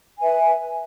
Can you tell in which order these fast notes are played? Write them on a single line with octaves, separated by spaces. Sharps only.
G#5 B4 E5